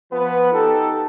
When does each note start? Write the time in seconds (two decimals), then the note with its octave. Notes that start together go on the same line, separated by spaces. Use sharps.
0.11 F3 B3 B4
0.53 D#4 G4 A4